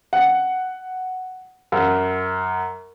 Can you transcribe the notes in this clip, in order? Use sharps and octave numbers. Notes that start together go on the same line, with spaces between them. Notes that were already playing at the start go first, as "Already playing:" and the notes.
F#5
F#2